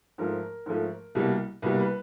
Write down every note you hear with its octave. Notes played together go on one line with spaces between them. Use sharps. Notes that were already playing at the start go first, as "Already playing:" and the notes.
G#2 F3 A3 A#4
G#2 F3 A3
C2 B2 G3 A#3
C2 B2 G3 A#3 B4
B4